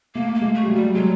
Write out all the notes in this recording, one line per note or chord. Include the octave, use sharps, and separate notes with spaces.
A3 A#3
A#3
G#3
A3
G3
F#3
G3
F#3 G#3